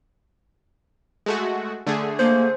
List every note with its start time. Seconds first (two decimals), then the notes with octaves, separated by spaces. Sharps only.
1.26 G#3 A3 F#4
1.87 D3 A3 G#4
2.19 A#3 C5